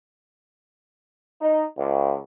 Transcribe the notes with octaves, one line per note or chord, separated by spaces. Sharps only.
D#4
C#2